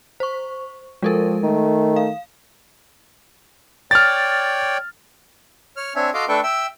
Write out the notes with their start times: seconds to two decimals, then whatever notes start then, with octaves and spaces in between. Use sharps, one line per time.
0.20 C5 C#6
1.03 F3 G#3 A4 A#4
1.43 D#3 A3
1.96 F5
3.91 C#5 D5 G5 F6 A6
5.77 C#5 F6
5.96 C4 D4 C#5 E5 G#5
6.14 F#4 A4 D#5 F5 C6 D6
6.29 A3 D4 A4 B4 G5 C#6
6.43 E5 G5 E6